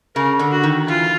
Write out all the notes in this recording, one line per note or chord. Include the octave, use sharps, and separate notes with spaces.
C#3 A#4
D3
F#4
D#3
E3 F4